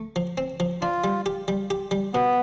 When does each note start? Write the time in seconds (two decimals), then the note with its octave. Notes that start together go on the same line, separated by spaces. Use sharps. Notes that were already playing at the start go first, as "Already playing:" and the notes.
Already playing: A3
0.16 F3
0.38 C4
0.60 F3
0.82 D4 F4
1.04 G3
1.26 G4
1.48 G3
1.70 G4
1.91 G3
2.14 B2 B3